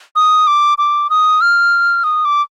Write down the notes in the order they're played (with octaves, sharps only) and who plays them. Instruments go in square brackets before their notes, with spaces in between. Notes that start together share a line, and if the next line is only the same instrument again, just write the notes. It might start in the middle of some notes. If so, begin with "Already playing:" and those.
[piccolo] D#6
D6
D6
D#6
F6
D#6
D6